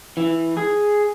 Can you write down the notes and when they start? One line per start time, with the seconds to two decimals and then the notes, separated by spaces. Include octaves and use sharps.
0.17 E3
0.57 G#4